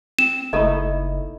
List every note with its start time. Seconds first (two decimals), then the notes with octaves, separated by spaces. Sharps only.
0.19 C4 E7
0.53 F#1 A3 D#4 E4 A4 D#5